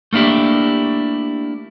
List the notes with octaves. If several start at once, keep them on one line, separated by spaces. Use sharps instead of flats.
A3 A#3 D4 E4 G4